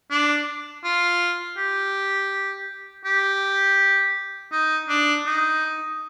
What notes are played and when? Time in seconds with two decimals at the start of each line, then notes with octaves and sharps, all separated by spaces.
0.11 D4
0.84 F4
1.57 G4
3.05 G4
4.52 D#4
4.89 D4
5.26 D#4